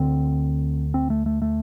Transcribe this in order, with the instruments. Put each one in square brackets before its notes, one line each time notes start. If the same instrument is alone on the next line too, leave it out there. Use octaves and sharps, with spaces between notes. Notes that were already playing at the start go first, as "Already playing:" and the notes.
Already playing: [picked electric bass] D2 D3 C4
C4
A3
A3
A3